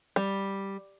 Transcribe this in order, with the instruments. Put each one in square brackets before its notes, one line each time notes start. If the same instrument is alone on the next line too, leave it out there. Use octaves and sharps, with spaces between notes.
[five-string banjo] G3